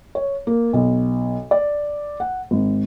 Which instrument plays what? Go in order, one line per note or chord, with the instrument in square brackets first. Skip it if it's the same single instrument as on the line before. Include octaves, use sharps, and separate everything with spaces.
[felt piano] C#5
A#3
B1
D5
F#5
G#1